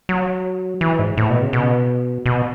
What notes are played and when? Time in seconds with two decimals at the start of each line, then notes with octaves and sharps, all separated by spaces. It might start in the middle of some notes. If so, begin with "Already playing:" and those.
0.09 F#3
0.81 E3
0.99 G#2
1.17 A2
1.30 B2
1.42 C#3
1.53 B2
2.26 B2